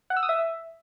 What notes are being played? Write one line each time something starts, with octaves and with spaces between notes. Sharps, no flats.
F#5
E6
D#6
E5